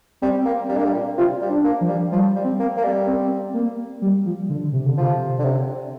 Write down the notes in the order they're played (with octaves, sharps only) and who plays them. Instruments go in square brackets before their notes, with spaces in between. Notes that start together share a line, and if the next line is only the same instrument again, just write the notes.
[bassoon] G3 [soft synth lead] C4
[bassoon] A#3
[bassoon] G3 [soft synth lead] D4
[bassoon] A#3
G3
A#2
[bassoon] C3 [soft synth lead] F4
[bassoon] G3
[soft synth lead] D4
[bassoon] A#3
[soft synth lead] F3
[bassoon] G3
[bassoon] F3 [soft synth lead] G3
[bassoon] G3
[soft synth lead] C4
[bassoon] A#3
A#3
G3
[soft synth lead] C4
A#3
G3
F3
D3
C3
D3
[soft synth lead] C3 [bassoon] F3
[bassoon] D3
C3